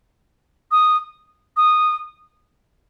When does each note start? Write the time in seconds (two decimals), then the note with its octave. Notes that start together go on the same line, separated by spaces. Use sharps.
0.72 D#6
1.57 D#6